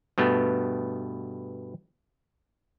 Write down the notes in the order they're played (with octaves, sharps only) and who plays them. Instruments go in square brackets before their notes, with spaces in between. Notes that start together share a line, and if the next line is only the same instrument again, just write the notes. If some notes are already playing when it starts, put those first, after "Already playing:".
[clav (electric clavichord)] G2 B2 A3 B3